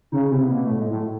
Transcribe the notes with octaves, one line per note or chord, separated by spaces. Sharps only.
C#3 D#4
C3 E4
B3
B2 A#3
A2 A3
G#3
A2
F#3